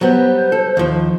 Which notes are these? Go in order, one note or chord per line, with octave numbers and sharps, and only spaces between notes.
F#3 G3 B3 C5
A4
D#2 F3